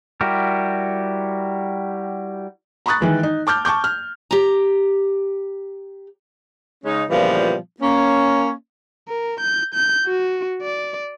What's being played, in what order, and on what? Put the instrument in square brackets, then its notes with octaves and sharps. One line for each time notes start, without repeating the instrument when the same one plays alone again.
[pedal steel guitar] G3 E4 F#4 G4 A#4
[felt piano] A#5 B5 C#6 D#6 F#6 A6
D#3 E3 G#3
D#4
A5 D6 F6 G6
A5 C#6 D6 G6
F6
[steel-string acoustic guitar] G4 A#5
[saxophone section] C#3 G#3 C#4 D#4
A#2 C#3 E3 F3 G3 B3
A#3 C#4
[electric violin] A#4
G6
G6
F#4
D5